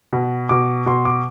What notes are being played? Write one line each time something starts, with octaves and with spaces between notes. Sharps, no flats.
B2
B2 D6
B2 C6
D6